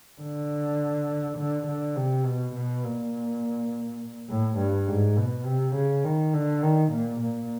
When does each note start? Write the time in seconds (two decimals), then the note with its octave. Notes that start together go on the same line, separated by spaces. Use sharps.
0.21 D3
1.38 D3
1.67 D3
1.96 C3
2.25 B2
2.55 B2
2.84 A#2
4.29 A2
4.58 G2
4.87 G#2
5.17 B2
5.46 C3
5.75 C#3
6.04 D#3
6.34 D3
6.62 D#3
6.93 A#2
7.21 A#2